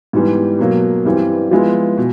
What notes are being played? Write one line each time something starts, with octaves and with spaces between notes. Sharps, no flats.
G#2 E3 G3 B3
B2 F#3 A#3
G2 E3 G3 C4
F3 G#3 B3 E4
B2